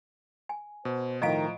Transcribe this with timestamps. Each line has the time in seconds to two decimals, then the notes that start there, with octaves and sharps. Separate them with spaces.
0.49 G#5
0.85 B2 C5
1.22 A2 D#3 F3 D#5 F5 A#5 D7